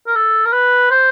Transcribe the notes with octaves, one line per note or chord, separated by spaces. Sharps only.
A#4
A4
A#4
B4
C5